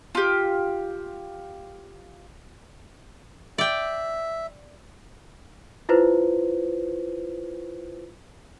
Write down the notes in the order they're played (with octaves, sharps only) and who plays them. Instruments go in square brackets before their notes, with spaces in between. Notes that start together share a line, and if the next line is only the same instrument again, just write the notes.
[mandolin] F4 G4
[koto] D5 G5 [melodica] E5
[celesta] E4 F4 B4 C5